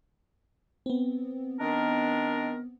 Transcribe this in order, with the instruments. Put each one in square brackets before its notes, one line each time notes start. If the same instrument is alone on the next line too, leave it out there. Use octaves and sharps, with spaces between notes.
[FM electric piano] B3 C4
[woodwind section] D#3 D4 A#4